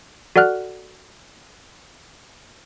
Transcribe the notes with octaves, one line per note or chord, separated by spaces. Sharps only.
F#4 A4 D5 F#5 F6 F#6